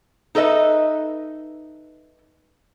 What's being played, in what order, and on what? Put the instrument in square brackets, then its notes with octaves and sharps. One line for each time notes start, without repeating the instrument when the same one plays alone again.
[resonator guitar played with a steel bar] D#4 A4 B4 D#5 E5